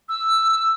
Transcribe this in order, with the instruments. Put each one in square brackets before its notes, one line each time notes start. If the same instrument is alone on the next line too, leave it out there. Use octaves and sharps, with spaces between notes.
[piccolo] E6